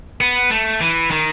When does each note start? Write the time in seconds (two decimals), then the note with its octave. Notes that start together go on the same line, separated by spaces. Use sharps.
0.21 B3
0.51 A3
0.81 E3
1.11 D#3